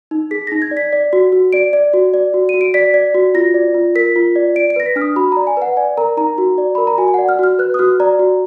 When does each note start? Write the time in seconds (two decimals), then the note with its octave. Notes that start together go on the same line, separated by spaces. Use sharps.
0.11 D#4
0.31 G#4 B6
0.47 D#4 A#6
0.62 G#6
0.71 D5
0.77 B6
0.93 D5
1.13 F#4
1.32 F#4
1.53 D5 D7
1.73 D5
1.93 F#4
2.14 D5
2.34 F#4
2.49 F#4 D#7
2.61 D7
2.74 D5 B6
2.94 D5
3.15 F#4
3.34 F4 A#6
3.54 D5
3.74 F4
3.95 A#4 B6
4.16 F4
4.36 D5
4.56 D5 D7
4.70 D7
4.76 B4 A#6
4.86 B6
4.96 D4 F6
5.01 D#6
5.16 F#4 B5
5.32 D5 A#5
5.47 G#5
5.57 B4 F#5
5.77 D5 G#5
5.97 A#4 A#5
6.17 D#4 A#5
6.38 F#4
6.58 D5
6.75 A#4 B5
6.87 A#5
6.98 F#4 G#5
7.08 G#5
7.14 D5 F#5
7.29 F6
7.39 F#4 F6
7.59 B4 F#6
7.74 D#6
7.79 F#4 F6
8.00 D5 A#5
8.19 F#4